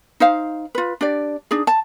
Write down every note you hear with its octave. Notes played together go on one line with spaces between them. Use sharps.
D#4 C5 F5
F4 B4
D4 G4 D5
D4 D#4 G#4
A5